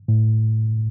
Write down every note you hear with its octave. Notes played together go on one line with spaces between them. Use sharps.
A2